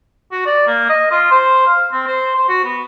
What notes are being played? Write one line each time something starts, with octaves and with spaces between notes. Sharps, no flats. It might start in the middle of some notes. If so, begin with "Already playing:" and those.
F#4
D5
A#3
D#5
F4
C5
F5
C4
C5
C5
F#4
B3